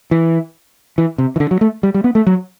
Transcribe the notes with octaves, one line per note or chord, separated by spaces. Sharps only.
E3
E3
C3
E3
D3
F#3
A3
G3
G3
B3
A3
F#3